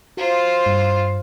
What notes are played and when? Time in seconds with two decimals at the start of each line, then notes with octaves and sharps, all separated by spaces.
0.17 F4 F#4 C5 A#5
0.66 G2